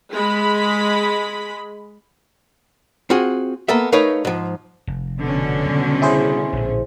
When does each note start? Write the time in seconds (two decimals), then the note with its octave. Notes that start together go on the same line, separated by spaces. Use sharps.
0.12 G#3 B5
3.10 C4 F4 F#4 G#4
3.68 A#3 B3 A4 E5
3.92 A3 D#4 A#4 B4 C#5 F5
4.25 G#2 F3
4.87 F1
5.19 B2 D3 C#4
5.65 C#3 F#3 G3
6.02 E4 G#4 C5
6.53 A#1 A2